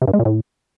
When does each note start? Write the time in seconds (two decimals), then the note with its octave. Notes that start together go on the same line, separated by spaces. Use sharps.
0.02 C3
0.08 G2
0.13 G#3
0.19 A#2
0.25 A2